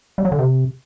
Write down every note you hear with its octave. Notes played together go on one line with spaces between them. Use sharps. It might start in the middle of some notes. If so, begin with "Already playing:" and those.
G3
F#3
D3
C3